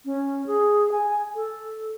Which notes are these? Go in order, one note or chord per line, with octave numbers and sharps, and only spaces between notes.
C#4
G#4
G#5
A4